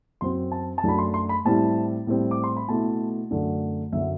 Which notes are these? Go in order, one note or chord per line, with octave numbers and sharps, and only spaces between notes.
F#2 F#3 C4 C6
A5
A5
F#2 F#3 A3 D4 B5
C6
C6
B5
A2 G3 C4 E4 A5
A2 G3 C4
D6
C6
B5
B2 A3 E4 A5
F#2 D3 A3 D4
F#2 D3 F#3 E5